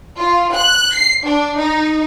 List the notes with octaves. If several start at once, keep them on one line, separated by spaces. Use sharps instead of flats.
F4
F#6
C7
D4
D#4